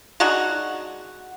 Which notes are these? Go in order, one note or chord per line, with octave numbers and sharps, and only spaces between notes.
G#3 D4 D#4 F#4